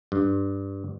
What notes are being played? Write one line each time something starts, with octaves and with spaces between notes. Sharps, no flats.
G2